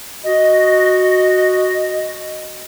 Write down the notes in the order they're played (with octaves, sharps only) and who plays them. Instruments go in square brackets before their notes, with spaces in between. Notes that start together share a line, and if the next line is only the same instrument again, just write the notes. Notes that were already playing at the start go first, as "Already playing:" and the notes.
[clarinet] F#4 [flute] D#5